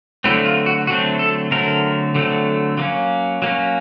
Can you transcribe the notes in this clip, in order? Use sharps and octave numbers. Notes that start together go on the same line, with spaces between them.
D3 F#3 A3 C4 E4
F4
F#4
D3 F#3 A3 C4 F#4
A4
D3 F#3 A3 C4 A#4
D3 F#3 A3 C4
F#3 A#3 C#4
F#3 A#3 C#4